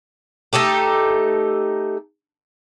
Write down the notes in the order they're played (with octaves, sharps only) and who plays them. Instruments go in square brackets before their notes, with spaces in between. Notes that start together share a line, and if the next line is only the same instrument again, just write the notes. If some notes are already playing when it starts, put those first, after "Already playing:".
[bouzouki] A3 D#4 G4 A4